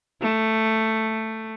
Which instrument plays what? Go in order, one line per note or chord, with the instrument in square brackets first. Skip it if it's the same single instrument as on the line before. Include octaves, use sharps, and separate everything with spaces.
[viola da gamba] A3